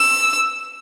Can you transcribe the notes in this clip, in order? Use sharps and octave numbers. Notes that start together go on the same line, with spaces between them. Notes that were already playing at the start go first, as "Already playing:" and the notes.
Already playing: E6